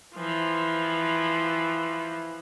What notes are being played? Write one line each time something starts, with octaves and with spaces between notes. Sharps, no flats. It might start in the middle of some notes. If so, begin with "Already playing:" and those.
E3 F3